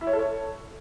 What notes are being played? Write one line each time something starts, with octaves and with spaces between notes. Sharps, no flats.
E4
C#5
A4
C#5